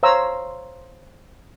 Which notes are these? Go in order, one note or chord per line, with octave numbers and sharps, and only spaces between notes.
C5 C#5 F5 A#5 E6